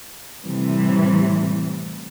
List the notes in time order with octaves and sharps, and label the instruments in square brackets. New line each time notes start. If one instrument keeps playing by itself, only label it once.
[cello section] A2 C3 E3 G3